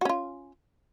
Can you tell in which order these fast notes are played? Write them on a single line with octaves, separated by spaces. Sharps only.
F#4 C#4 F4